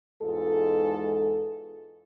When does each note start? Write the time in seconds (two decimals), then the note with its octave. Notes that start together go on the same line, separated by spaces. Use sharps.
0.23 E2 G#2 G#3 F4 A4